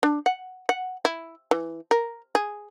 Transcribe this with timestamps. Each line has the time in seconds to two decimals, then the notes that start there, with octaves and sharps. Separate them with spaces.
0.03 D4
0.26 F#5
0.69 F#5
1.05 E4
1.51 E3
1.91 A#4
2.35 G#4